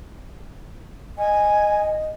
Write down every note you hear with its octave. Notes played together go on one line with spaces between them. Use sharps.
D#5 G#5